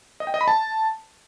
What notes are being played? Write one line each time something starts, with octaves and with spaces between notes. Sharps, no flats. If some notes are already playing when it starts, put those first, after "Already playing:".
D#5
G5
D#5
B5
A5